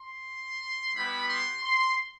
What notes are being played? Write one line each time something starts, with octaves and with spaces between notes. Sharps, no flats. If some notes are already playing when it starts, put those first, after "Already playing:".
Already playing: C6
G3 B3 E4 G4 B5
C6
C6